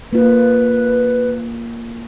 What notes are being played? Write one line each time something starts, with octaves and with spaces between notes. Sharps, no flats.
A#3 F4 B4